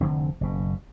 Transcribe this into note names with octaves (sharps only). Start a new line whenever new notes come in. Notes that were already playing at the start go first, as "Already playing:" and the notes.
F1 D3 C4
F#1 B2